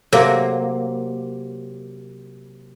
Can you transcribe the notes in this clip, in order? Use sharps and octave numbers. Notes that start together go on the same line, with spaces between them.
C3 F#3 A#3